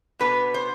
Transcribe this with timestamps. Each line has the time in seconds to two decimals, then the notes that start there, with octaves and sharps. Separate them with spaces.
0.19 B2 B3 D4 B4
0.54 C5